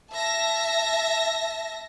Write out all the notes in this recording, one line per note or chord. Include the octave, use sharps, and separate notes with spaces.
E5 A5 A#6